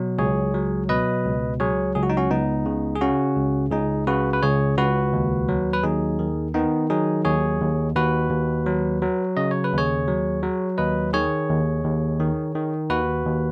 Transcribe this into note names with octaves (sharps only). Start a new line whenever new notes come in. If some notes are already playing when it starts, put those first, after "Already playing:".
Already playing: B2 F#3
C#2 G#4 C#5
F#3
B2 B4 D#5
C#2
F#3 G#4 C#5
C#2 G#4
F#4
D#4
C#4 F#4
C#2 B3 D#4
C#3
G#4
C#3 C#4 F#4
C#2
C#2 D#4 G#4
C#3 F#4 B4
B4
C#2 G#4 C#5
C#2 F#4 B4
D#2
F#3
B4
D#2 D#4 G#4
D#3
D#3 B3 D#4
F#3 D#4 G#4
D#2 G#4 C#5
D#2
D#2 F#4 B4
D#2
F#3
F#3
C#3 D#5
C#5
B4
D#2
G#4 C#5
F#3
F#3
D#2 B4 D#5
D#3 G#4 C#5
D#2
D#2
D#3
D#3
D#2 F#4 B4
D#2